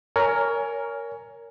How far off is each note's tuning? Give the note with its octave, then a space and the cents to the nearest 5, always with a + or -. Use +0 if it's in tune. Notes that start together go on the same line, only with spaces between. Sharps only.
A#4 +0 C#5 +25 G#5 +0